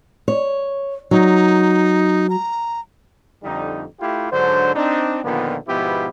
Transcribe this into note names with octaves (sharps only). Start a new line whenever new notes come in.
C#5
F#3 D#4
A#5
F2 D3 G3 D#4
A3 E4 F4 G4
G#2 D3 F#3 D4 C5
C4 D4 D#4
A#2 D3 D#3 F3 B3
G#2 B2 F3 B3 E4 G4